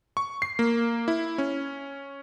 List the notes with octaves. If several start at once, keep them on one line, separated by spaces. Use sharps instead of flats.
C#6
C7
A#3
E4
C#4